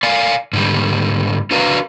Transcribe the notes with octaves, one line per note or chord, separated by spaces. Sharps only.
D5 F5 G#5
G#2 D3 G3
D4 F#4 A#4 B4 F5 A#5